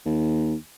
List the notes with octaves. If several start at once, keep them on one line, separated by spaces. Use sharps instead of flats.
D#2